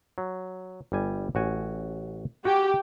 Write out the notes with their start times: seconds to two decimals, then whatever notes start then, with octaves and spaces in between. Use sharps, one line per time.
0.18 F#3
0.92 G1 G3 G#5
1.35 A1 F#4 G#5
2.45 F#4 G4 G#5